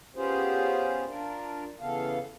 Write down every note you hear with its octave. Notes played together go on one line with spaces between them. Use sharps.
B3 C#4 F4 G4 G#4 C5
D4 F4 A#4 D5
C#3 E3 B3 A4 F5